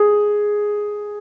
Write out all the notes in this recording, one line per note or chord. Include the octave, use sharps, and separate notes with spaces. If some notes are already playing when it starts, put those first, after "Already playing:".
Already playing: G#4